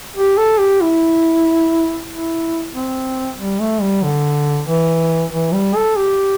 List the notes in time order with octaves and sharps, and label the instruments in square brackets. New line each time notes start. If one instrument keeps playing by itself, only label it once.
[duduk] G4
A4
G4
E4
E4
C4
G3
A3
G3
D3
E3
E3
G3
A4
G4